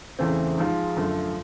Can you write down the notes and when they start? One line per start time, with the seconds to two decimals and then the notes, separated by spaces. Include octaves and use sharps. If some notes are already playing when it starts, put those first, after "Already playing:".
0.19 E2 C#3 E3 A3 C4
0.58 G#2 F3 G#3
0.97 F#2 D3 F3 A3